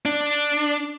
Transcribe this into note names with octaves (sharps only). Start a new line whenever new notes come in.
D4